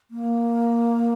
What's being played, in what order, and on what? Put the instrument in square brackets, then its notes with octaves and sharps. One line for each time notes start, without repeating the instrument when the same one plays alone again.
[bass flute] A#3